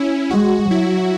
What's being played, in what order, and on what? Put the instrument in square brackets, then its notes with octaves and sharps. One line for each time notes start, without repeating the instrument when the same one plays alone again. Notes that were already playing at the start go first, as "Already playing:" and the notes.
Already playing: [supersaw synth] C#4 E4
[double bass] G#3 [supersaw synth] F#4
[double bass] F#3 [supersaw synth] E4